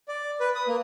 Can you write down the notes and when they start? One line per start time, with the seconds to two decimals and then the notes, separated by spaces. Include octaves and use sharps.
0.08 D5
0.40 B4
0.55 D#6
0.68 A#3